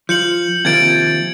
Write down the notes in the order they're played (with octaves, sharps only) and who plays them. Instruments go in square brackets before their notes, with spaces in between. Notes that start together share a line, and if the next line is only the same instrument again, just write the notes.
[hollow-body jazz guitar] F3 [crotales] G6 C#7 F#7
[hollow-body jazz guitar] D#2 C3 F3 [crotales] G#6 A6 D7